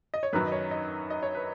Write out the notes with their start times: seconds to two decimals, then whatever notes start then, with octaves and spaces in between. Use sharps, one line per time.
0.14 D#5
0.23 C#5
0.33 F#2 D#3 F#3 B4
0.47 D#5
0.52 C#5
0.71 D#5
1.10 D#5
1.23 C#5
1.35 B4